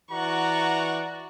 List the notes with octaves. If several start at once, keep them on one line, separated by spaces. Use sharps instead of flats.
E3 F#4 D5 F#5 A#5 C#6